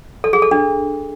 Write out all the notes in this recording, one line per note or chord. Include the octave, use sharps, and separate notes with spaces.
A4
G#4
A4
D4